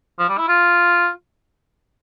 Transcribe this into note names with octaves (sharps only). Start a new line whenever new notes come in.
F3
G3
E4
F4